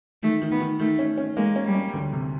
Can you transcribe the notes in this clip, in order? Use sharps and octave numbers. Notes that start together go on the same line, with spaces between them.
D#3 A3
D#3
B3
D#3
D#3 A3
C#4
C#4
G#3 A#3
C#4
G3
C#4
D2
C3